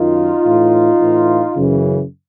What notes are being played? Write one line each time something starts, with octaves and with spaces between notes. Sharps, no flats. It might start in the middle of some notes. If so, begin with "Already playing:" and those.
Already playing: F#2 D#3 D#4 F4
A2 E3
A2 E3
F#2 C#3 E3